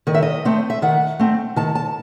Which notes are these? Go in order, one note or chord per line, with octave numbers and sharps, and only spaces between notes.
D#3 D#5
E5
D#5
A3 C4
E5
D#3 F#5
A3 C4
D#3 A5
A5